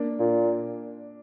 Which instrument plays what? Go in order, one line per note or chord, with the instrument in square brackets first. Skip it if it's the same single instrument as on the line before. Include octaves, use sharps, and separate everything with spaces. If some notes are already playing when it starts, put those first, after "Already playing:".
Already playing: [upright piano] A#3 D4
[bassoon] A#2